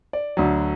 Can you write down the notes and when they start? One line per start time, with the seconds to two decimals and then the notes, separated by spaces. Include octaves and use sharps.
0.13 D5
0.37 D2 D3 F#3